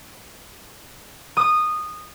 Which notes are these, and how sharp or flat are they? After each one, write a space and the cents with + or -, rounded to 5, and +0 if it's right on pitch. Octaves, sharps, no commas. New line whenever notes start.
D#6 -15